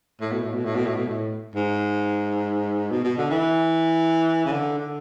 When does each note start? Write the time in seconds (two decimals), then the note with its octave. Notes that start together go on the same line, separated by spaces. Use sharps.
0.21 A2
0.32 B2
0.43 A2
0.54 B2
0.65 A2
0.75 B2
0.86 A2
0.96 B2
1.08 A2
1.55 G#2
2.91 B2
3.04 B2
3.18 D3
3.30 E3
4.45 C#3
4.52 D3
4.79 D3